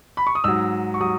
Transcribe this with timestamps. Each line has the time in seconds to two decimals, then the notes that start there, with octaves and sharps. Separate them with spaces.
0.17 B5
0.27 C#6
0.35 D#6
0.44 G#2 F#3 E6
0.94 C#6
1.01 F#3 D#6